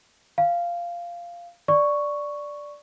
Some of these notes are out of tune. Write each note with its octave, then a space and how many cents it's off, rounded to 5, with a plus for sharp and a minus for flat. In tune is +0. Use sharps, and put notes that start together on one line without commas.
F5 -10 G#5 +0
D5 +0 C#6 +0